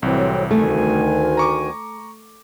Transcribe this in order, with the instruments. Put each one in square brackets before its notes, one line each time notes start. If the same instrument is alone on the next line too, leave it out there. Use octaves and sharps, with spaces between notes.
[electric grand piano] C2 E3 [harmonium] A2 F#3 C4
[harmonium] D2 D#3 G#5 [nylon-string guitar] A3
[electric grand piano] A#5 C#6 D6